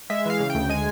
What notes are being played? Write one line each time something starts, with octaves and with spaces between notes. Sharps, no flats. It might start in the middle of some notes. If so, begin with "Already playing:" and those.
G#3 E5
E3 F5
C#3
G5
D2
G#3 G#5